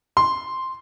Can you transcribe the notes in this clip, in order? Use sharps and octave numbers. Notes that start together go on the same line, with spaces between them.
C6